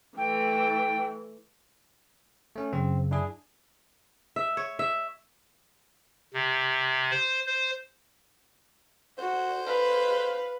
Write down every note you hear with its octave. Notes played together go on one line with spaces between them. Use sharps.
E3 A3 G5
A3 C#4
F#2 C#3 C4
D4 E4 G#4
E5
C#5
E5
C3
C5
C5
F#4 C5
B4 F5